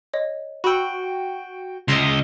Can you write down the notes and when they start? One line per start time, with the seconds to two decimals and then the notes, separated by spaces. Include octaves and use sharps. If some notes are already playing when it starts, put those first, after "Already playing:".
0.13 C#5 D#5
0.64 F#4 G5 B5 E6
1.88 C#2 D#5 E5 A#5 C6